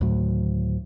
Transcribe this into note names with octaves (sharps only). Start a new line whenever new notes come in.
D2 A2 D#3 F#3